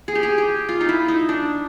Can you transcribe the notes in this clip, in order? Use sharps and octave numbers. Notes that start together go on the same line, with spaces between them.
G#4
G4
G#4
G4
F4
D#4
E4
D#4
D4